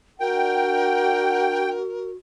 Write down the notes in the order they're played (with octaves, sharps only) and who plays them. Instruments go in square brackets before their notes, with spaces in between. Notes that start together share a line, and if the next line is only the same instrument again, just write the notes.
[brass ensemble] D4 F#5 [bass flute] F#4 [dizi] A#4 [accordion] G5